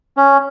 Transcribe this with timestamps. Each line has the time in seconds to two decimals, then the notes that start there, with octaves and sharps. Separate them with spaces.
0.17 C#4